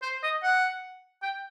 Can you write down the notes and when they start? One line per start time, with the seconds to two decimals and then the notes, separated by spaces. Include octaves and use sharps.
0.02 C5
0.23 D#5
0.43 F#5
1.23 G5